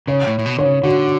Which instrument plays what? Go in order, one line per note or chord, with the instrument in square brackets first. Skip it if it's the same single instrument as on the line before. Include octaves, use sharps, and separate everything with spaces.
[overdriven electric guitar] C#3 [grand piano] C#5
[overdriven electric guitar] A2
A2
B2
[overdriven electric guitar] D3 [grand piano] C#5
[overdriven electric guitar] C#3
[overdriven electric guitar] D3 [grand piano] F#4